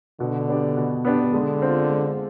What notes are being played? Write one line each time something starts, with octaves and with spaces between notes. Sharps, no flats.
B2 D3
B3 D4 G4 D5
B2
B3 D4 G4 D5
D3 G#3
C4 F4
G#3